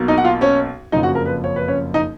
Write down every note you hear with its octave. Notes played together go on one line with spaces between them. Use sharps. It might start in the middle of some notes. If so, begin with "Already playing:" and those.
Already playing: B1 B2 A#3
D#4 D#5
F#5
F4 F5
C#4 C#5
F#1 F2 C#3 F3 D#4 D#5
F#4 F#5
A#4
B4
C#5
B4
C#4 C#5
D#4 D#5